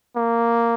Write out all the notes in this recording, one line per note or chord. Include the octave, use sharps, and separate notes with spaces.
A#3